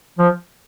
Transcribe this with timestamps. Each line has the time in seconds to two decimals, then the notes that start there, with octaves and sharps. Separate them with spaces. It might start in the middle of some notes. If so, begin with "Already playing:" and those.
0.18 F3